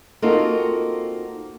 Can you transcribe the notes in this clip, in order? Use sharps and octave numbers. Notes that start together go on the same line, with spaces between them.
A#3 C4 D#4 F4 F#4 A4